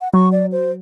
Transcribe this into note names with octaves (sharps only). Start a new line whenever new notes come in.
F#5
F#3 C#6
D5
C5